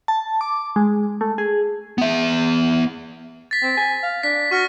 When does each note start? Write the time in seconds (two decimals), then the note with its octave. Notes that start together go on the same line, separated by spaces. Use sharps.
0.08 A5
0.41 D6
0.76 G#3
1.21 A3
1.38 G#4
1.98 B3 E5
3.51 A6 B6
3.63 C4
3.77 G#5
4.03 F5
4.23 D4 B6
4.51 F#4 C#6 F6 A#6